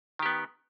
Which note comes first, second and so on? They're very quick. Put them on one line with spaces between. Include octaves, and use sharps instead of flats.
D#3 G4 B3